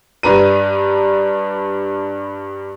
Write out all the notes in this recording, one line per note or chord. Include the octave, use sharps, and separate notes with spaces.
G2 D4 B4 A#5 D#7